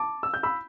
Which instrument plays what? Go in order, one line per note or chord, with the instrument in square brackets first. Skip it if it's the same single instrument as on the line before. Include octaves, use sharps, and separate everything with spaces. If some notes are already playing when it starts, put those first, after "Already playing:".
Already playing: [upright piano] A5 D6
E6
G6
B5 E6